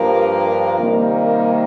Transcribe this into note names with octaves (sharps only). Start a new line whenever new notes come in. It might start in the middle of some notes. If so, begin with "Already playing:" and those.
Already playing: G2 F3 A#3
C3 D#3 G3 A#3